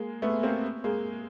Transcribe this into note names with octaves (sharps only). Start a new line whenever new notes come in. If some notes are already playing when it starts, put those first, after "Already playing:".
Already playing: G#3 A#3
A3 B3
A#3 C4
G#3 A#3